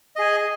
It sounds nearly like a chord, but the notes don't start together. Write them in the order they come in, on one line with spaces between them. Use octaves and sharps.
D#5 G#4 G#5